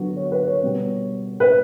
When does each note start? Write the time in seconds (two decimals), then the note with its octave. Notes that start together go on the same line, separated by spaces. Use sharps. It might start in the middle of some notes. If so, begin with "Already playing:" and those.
Already playing: D3 F#3 B3 F#4
0.17 C#5
0.32 B4
0.47 C#5
0.63 B2 G3 B3
1.40 B4